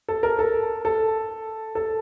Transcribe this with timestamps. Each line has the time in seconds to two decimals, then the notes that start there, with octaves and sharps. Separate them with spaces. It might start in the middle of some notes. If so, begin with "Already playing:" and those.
0.08 A4
0.23 A#4
0.39 A4
0.85 A4
1.75 A4